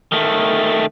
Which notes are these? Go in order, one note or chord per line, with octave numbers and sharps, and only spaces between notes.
D#3 A3